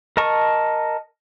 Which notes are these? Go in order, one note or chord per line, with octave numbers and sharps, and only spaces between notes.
A#4 D#5 A5 C#6